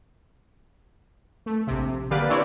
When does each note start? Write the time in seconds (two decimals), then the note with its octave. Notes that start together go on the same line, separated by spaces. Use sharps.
1.46 A3
1.67 A#1 C3
2.11 D3 A#3 G4 B4 D5 F5
2.29 C4 D4 E4 C#5 D5